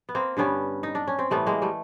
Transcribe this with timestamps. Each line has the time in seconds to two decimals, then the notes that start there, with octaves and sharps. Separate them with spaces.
0.09 B3
0.15 A#3 C4
0.37 G2 D3 G3 B3 C#4
0.83 D#4
0.95 D4
1.07 C#4
1.19 C4
1.31 A2 E3 G3 A3 B3
1.46 G#3 A#3
1.62 G3 A3